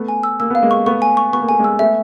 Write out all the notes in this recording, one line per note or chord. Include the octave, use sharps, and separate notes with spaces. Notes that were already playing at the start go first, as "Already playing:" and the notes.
Already playing: A3 B3
G#5
E6
A#3 E6
B3 F5
G#3 A#3
C#6
A3 B3 C#6
G#5
C#6
B3 C#6
A#3
A3 G#5
G#3 A#3
E6
A3 B3 E5